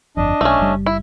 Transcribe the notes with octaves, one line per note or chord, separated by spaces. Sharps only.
G1 F2 D4 D#5
B1 A3 C#4
F#1 G3
E4